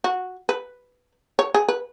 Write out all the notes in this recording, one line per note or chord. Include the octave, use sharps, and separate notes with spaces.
F#4
B4
C#5
G#4
B4